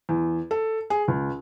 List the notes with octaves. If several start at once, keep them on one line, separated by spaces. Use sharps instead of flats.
E2
A4
G#4
C#2